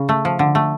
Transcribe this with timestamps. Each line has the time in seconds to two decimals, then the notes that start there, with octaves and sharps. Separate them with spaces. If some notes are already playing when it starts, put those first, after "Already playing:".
Already playing: C#3
0.09 A3
0.25 F3
0.39 D3
0.55 A3